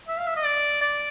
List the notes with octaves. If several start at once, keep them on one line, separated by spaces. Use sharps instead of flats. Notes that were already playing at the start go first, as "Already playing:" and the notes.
E5
F5
E5
D#5
D5
D5